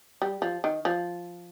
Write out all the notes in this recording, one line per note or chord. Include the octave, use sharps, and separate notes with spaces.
G3
F3
D#3
F3